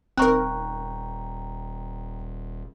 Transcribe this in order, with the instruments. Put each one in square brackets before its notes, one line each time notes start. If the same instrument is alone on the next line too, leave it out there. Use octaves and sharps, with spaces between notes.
[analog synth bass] D#1 [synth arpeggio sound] C4 D#4 A#4 [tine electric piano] G5 A#5 [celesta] C#6 F#6